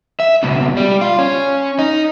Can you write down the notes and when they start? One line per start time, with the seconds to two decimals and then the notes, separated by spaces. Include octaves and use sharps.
0.20 E5
0.43 C#2 B2
0.77 G3
1.01 F4
1.19 C#4
1.79 D#4